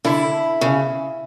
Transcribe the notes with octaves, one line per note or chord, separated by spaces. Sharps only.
D3 E4
C#3